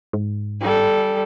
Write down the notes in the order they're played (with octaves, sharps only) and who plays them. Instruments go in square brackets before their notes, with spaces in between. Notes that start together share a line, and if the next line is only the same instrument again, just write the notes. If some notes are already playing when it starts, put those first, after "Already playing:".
[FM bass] G#2
[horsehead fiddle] G3 A4